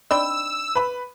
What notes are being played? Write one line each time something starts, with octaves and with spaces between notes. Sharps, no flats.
C4 D4 D#4 D5 B5 E6
B4 B5